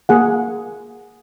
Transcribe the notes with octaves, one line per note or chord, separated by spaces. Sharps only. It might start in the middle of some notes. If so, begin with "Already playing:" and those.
A#3 G#4 F#5